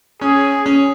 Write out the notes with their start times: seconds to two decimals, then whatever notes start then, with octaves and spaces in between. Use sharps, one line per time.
0.21 C#4 G#4
0.66 C#4